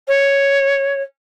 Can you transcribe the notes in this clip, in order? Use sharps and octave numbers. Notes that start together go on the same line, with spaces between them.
C#5